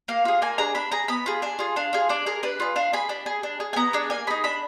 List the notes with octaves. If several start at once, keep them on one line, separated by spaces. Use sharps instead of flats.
A#3 F5
F4 G#4
A#3 G#5
D4 G#4 A#5
D4 B5
G#4 A#5
B3 B5
F4 G#4
D4 G#5
F4 G#4
D4 F5
F4 G#4
D4 D5
G#4 A#4
D4 B4
F4 G#4
D4 F5
G#4 B5
D4
G#4
D4
G#4
G#5
B3 A#5
D4 G#4
A#3 G#5
D#4 G#4 B5
D4 B5